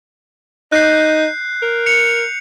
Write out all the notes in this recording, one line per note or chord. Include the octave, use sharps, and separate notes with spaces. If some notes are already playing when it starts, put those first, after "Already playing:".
D#4 F#6 G6 C7
A#4
C#7 F7